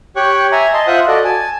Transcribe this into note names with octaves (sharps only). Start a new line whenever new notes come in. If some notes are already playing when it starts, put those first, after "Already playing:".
G4 C#5 G5 C#6 F#6
E5 G#5 A#5
D#5 A5 C6
F4 C5 E5 F#5 D#6 F#6
F#4 A4 D5 D#5
G#5 A5